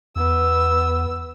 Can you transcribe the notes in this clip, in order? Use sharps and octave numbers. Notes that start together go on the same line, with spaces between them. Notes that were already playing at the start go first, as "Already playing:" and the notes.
E2 B3 E6